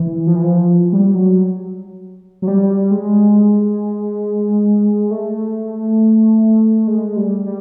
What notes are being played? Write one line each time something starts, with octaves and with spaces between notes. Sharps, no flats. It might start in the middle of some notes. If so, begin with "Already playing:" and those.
Already playing: E3
F3
E3
F3
G3
F#3
F#3
G3
G#3
A3
G#3
G3
G3